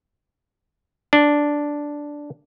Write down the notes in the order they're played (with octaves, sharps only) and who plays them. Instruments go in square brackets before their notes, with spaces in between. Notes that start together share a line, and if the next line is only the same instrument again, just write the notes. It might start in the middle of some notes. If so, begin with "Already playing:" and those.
[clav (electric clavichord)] D4